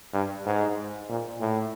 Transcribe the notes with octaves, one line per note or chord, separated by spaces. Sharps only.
G2
G#2
A#2
A2